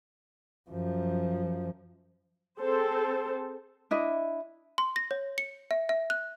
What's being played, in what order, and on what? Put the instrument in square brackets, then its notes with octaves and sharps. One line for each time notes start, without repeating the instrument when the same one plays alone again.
[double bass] F#2 F3
[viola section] C4 G#4 A4 C5
[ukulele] D4 E4 D#5
[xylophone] C6
A#6
C#5
C#7
E5
E5
F#6